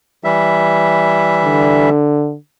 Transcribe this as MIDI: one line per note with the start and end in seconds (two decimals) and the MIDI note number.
0.24 1.90 52
0.24 1.90 55
0.24 1.90 76
1.44 2.36 50